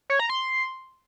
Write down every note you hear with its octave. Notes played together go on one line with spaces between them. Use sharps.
C#5
A#5
C6